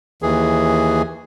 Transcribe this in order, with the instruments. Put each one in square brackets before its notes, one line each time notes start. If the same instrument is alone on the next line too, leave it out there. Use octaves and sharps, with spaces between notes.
[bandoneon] D#2 E3 G#4